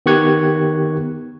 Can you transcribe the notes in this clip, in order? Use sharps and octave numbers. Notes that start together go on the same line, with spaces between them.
D#3 B3 G4 C#6 F#6 G#6